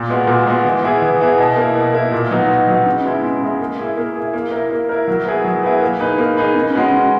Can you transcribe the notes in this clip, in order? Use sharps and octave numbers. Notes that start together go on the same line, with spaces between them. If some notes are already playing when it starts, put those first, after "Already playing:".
Already playing: A#2
G#3 B3 F#4
A#2
G#3 B3 F#4
E3
B3 E4 G#4
E3
B3 E4 G#4
B2
A#3 E4
B2
A#3 E4
A#2
F#3 B3 D#4 F#4
A#2
F#3 B3 D#4 F#4
C#3
G#3 B3 E4
C#3
G#3 B3 E4
A#3
E4 G#4
A#3
E4 G#4
A#3
E4 A#4
A#3
E4 A#4
F#3
B3 E4 G#4 B4
F#3
B3 E4 G#4 B4
A#3
D#4 G#4 B4
A#3
D#4 G#4 B4
C#3
G#3 C#4 F#4 B4
C#3